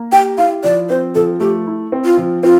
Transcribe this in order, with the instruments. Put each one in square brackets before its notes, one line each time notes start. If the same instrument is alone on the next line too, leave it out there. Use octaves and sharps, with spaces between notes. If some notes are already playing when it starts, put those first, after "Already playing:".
Already playing: [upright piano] A#3
[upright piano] G4 [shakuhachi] G5
[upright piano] E4 [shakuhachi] F5
[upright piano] F3 [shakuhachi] D5
[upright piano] C4 [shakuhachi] C5
[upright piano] F3 [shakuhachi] A4
[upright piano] A3 [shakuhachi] G4
[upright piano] E4
C4
[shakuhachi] F4
[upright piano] F3
[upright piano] C4 [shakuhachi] F4